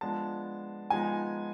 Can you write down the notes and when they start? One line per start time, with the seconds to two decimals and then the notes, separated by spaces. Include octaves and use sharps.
0.01 F3 G#3 B3 D4 A5
0.90 F3 G#3 B3 D#4 G#5